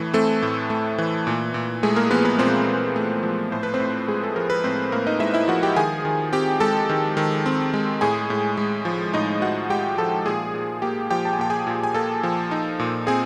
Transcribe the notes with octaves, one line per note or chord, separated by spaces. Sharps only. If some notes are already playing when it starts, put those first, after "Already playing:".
Already playing: A2 E3 A3
A3 C4 A4
A2
A3
E3
A#2
A#2
G#3 A3 G#4
A#3 A#4
F3 B3 B4
B3 B4
A#2 C4 C5
A#2
A3
F3
A2 C5
B4
C4 C5
A2
G#3 G#4
A4
F3 A#4
B4
A2 C4 C5
A2 A#3 A#4
D#4 D#5
G#3 E4 E5
E4 E5
F3 F#4 F#5
G4 G5
D#3 G#4 G#5
D#3
C4 G4 G5
G#3 A4 A5
D#3
D#3
C4
G#3
A2 G#4 G#5
A2
G#3
F3
A2 D#4 D#5
A2 F#4 F#5
G#3 G4 G5
F3 A4 A5
A#2 G#4 G#5
A#2
A#3 G4 G5
F3 G4 G5
A5
G#5
A#2 G5
G#4 G#5
A#2
G#5
A#3 A4 A5
F3
D#4
A#2
C4 G#4 G#5